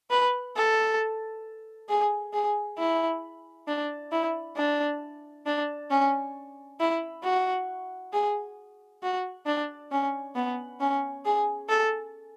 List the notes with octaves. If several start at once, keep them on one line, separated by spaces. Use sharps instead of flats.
B4
A4
G#4
G#4
E4
D4
E4
D4
D4
C#4
E4
F#4
G#4
F#4
D4
C#4
B3
C#4
G#4
A4